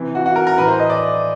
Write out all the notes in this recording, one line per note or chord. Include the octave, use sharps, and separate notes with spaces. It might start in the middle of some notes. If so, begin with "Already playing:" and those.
Already playing: C3 E3
F#4
F#4
A#4
A#4
A2 E3 B4
C5
D#5
D5